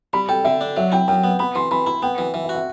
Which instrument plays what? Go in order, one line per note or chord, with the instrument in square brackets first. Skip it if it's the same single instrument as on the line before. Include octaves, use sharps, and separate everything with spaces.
[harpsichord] G3 [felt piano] B5
[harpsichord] A4 [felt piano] G5
[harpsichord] D3 [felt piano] E5
[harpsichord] D4
[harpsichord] F#3 [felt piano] E5
[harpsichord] E4 [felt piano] G5
[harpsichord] F#2 [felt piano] G5
[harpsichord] B3
[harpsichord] B3 [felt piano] B5
[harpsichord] E3 [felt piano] C6
[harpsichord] E3 [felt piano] B5
[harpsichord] E4 [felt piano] B5
[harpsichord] B3 [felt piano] G5
[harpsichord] E3 [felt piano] F#5
[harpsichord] E3 [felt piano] E5
[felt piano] E5
[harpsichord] F#4
[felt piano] E5